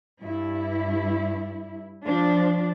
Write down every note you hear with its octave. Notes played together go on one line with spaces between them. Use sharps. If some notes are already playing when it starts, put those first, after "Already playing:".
G2 E4
F3 D4